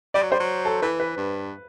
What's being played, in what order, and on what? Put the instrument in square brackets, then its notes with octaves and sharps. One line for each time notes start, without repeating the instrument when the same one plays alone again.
[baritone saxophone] G3 [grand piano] D5
[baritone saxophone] F#3
[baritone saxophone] G3 [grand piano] C5
[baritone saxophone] F#3
[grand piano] A4
[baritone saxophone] E3 [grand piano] B4
[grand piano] B4
[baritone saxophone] G2